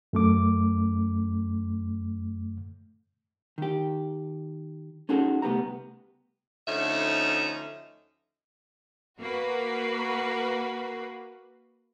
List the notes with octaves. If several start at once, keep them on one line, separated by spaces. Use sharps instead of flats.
F#2 A3 D6
D#3 G4
C#4 D#4 F#4 G#4 A4
C2 A3 B3 G4 A#5
D2 D3 F3 C#4 D#4 E5
A#3 F#4 B4